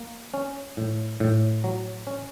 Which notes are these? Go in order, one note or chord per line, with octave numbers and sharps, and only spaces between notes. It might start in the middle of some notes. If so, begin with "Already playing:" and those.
Already playing: A#3
C#4
A2
A2
F#3
C#4